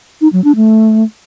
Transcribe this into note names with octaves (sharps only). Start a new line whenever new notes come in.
D#4
F#3
D4
A3